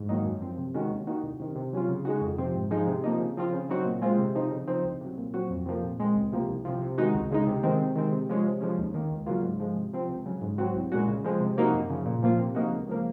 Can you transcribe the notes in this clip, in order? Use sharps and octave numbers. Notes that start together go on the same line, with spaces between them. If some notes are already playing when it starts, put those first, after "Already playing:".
Already playing: G#2
D#3 F#3 A#3 D#4
F#2
F3 C4
C3
D#3 G#3 C#4 F#4
D#2
D#3 A#3 D#4 F#4
C2
C3 D#3
C3
F#3 C#4 F4
C#3
G#3 D#4 F#4
F2
C3 F3 C4
G#2
F3 G#3 D#4
C3
F3 A#3 D#4
C#3
F3 C4 F4
C#3
F#3 C4 D#4 F#4
A#2
G#3 C4 F4
C3
F3 C4 D#4
C#3
F3 C4 D#4
C2
C3 F#3
A#2
F#3 C4 F#4
F2
C3 F3 A#3
A#2
G#3 C4
C#2
C3 F3 A#3
C2
C3 F3
C3
D#3 G#3 D#4 F#4
C#2
C#3 G#3 D#4
C3
D#3 G#3 C4
C3
D#3 G#3 C4
C3
F3 G#3 C#4
C3
F3 G#3 C#4
D#2
D#3 A#3
C#2
C#3 F#3 A#3 F4
G#2
F3 G#3
C3
F3 C4
C#2
C#3 F#3
G#2
F#3 C4 F#4
C2
A#2 G#3 C#4 F#4
C#3
F3 G#3 C4
C3
F3 A#3 D#4 F#4
F#2
C#3 F3
A#2
F3 A#3 F4
C3
F3 A#3 D#4 F#4
C#2
C#3 F3 A#3